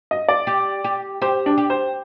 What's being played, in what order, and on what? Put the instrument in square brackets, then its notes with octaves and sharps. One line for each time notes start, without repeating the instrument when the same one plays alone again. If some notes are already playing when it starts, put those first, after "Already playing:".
[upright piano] D#5
D5
[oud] G4
G4
[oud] G4 [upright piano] C5
[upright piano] D4
[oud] G4
[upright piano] C5